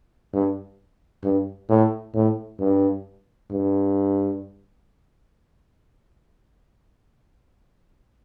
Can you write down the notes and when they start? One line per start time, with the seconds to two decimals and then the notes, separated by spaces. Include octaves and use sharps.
0.34 G2
1.24 G2
1.69 A2
2.15 A2
2.60 G2
3.51 G2